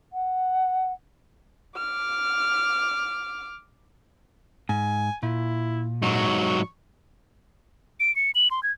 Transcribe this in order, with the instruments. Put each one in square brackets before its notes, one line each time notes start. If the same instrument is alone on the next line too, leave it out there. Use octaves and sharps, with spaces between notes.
[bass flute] F#5
[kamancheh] D6 F6
[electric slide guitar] G#2 [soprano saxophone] G#5
[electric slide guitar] A#2 [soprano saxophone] E4
[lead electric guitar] G#2 F#3 [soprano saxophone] C#6
[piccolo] D7
C#7
F#7
C6
G#6